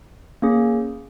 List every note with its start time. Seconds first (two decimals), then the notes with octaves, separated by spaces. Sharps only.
0.42 A#3 C#4 G#4